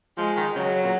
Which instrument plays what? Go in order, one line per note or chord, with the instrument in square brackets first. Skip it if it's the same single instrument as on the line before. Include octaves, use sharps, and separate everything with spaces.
[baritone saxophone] F3 [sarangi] G#3
[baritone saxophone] D#3
[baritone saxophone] C#3 [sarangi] F#3
[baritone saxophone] A#2